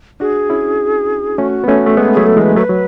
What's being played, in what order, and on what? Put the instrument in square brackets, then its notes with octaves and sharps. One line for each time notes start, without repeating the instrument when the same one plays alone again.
[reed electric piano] D4 F#4 [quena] G#4
[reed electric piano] C#4 E4
[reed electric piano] A3 C#4 [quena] F#4
[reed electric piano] B3
[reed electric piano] A3 C#4 [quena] F#4
[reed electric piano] A3
[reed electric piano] G#3 B3 [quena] G#4
[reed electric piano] F#3 A3 [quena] G#4
[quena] A4
[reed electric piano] E3 G#3
[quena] B4
[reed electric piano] F#3 A3 [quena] B4
[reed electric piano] F#3